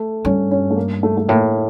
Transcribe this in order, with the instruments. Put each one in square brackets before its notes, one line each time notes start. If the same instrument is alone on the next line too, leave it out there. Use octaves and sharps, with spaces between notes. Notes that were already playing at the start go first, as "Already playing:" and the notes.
Already playing: [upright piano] A3
[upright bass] G2 [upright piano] C#4
[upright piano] C#4
A3
A#3
A3
A3
[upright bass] A2 [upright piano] A#3